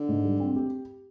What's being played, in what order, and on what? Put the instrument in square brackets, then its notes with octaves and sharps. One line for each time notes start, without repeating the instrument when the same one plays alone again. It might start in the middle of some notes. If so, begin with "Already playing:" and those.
Already playing: [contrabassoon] D3
[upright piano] G#2
G3
C4
G4